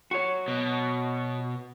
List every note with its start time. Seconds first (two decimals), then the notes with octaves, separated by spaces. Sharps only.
0.11 F#4 C#5
0.48 B2